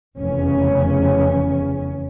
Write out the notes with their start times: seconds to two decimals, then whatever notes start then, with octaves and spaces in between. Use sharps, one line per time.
0.18 F1 E2 C#3 C#4